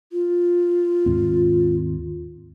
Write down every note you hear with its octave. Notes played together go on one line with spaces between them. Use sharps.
F4
D#2 G#2 C4